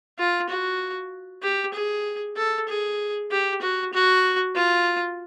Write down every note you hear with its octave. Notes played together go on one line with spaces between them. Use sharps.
F4
F#4
G4
G#4
A4
G#4
G4
F#4
F#4
F4